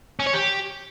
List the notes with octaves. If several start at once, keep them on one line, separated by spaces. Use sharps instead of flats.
C#4
C#5
G4